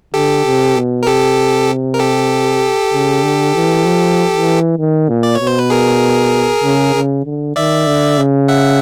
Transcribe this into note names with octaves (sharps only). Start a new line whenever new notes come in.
D3 G4 A4
C3
B2
A#4
C3 G4 A4
A#4
G4 A4
C#3
D3
E3
F3
E3
D#3
A#2
D5
C#5
B2
C5
B4
G#4 A#4
C#3
C#3
D3
D#3 D5 E5
D3
C#3
E5 F#5